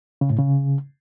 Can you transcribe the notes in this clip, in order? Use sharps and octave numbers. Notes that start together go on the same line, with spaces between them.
C#3
A2
C#3